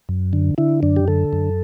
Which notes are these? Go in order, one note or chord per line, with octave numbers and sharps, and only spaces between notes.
F#2
D3
D3 E4
F#2 D4
G4
D3 A4
F#2